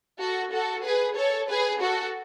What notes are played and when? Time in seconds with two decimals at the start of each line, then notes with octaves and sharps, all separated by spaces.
0.20 F#4 A4
0.52 F#4 A4
0.85 G#4 B4
1.17 A4 C#5
1.50 G#4 B4
1.81 F#4 A4